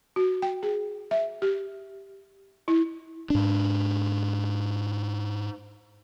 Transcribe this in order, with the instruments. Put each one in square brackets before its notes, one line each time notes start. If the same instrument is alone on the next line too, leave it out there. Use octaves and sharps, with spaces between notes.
[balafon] F#4
G5
G#4
E5
G4
E4
[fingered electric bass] G#2 D4